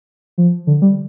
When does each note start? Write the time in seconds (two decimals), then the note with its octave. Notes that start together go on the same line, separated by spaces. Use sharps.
0.38 F3
0.67 D3
0.82 G3